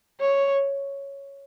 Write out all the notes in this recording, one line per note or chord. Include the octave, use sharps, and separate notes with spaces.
C#5